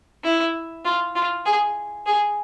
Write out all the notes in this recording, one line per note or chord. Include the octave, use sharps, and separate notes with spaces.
E4
F4
F4
G#4
G#4